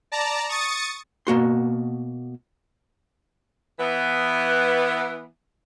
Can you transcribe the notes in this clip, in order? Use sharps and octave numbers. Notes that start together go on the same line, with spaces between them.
D5 A5 A#5
C#6 D#6 A6 C#7
B2 A#3 F#4 C6
E3 B3